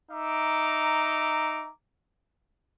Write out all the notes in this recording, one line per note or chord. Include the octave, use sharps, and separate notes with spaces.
D#4 E5 A#5 D6